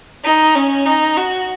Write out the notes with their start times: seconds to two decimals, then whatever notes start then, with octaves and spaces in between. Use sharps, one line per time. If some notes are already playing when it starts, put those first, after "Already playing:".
0.24 D#4
0.55 C#4
0.86 D#4
1.17 F#4